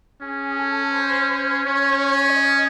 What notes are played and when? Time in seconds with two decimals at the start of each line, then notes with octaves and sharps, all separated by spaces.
0.21 C#4 G#4
0.57 A4
0.94 C5
1.65 C#4 C#5
2.36 D#5